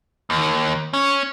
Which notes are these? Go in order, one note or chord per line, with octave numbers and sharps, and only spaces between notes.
D#2
C#4